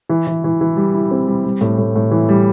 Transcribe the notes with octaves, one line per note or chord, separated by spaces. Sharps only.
E3
E3
E3
E3
G3
E4
C4
G3
G3
A2
A2
A2
E3
G3